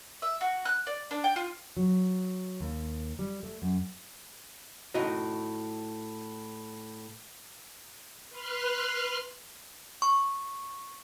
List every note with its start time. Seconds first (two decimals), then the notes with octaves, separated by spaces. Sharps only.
0.22 E5
0.41 F#4
0.65 F#6
0.87 D5
1.11 D4
1.24 G5
1.36 F4
1.77 F#3
2.60 D#2
3.19 G3
3.43 A3
3.62 F#2
4.94 A2 D#4 F#4 D#5
8.30 B4 C6 F6 F#6
10.02 C#6